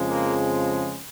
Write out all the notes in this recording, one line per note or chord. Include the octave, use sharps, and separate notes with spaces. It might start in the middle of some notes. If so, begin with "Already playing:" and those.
Already playing: F2 C#3 F3 G#3
A#3